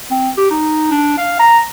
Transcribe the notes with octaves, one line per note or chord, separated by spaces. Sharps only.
C4
G4
D#4
D4
F5
A#5